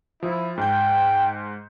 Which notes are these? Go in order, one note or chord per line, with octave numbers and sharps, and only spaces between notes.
F3 E4
G#2 G5 G6